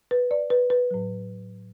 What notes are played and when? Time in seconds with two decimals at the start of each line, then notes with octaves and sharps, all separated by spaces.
0.11 B4
0.31 D5
0.50 B4
0.70 B4
0.91 A2 F#3